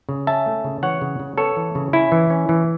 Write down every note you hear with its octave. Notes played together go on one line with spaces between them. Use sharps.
C#3
C#4 E5 A5
A3
C#3
E3 C#5 F#5
C#3
C#3
B3 A4 C#5
E3
C#3
C#4 E4
E3
C#4
E3